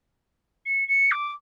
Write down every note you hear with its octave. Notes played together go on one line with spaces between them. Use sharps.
C#7
C#7
D6